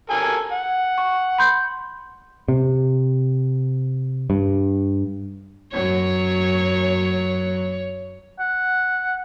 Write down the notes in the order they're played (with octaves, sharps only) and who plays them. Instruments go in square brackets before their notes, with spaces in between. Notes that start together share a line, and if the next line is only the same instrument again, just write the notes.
[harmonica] A4 A#4 G#5
F#5
[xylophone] C#6
B5 C6 G6
[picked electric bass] C3
G2
[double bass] F#2 F#3 [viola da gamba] C#5
[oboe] F#5